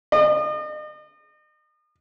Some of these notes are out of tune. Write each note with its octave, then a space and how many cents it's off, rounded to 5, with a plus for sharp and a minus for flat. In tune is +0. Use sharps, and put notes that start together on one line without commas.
D#5 -40